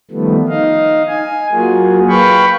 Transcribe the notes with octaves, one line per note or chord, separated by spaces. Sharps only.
D#3 F3 G3 A3 B3
D#4 D#5 F5
G#5
F#3 A#3 F4 F#4 G#4
B4 F5 G5 B5 C#6